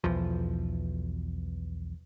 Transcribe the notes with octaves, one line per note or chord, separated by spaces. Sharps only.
B1 E2 F3